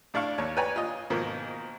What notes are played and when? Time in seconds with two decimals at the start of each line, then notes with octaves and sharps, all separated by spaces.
0.14 A2 D4 D5 F5 C#6
0.38 D#2 C#5
0.56 B4 C#5 D5 G5 G#5 A#5
0.76 F4 D#5
1.10 G#2 B2 D#3 F3 A#3